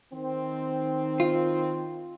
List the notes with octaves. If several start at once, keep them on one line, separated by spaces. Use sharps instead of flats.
D#3 C4
F4